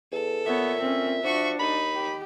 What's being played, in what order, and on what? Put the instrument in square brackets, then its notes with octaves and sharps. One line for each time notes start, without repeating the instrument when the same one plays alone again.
[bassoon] E2 [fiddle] A4
[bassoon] A#2 [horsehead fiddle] B3 C#5 [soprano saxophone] E5
[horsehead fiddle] C4 C#4
[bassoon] F3 [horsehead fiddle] D4 [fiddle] F#4 C#6
[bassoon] D#2 [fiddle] D#4 [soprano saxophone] B5
[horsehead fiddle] G4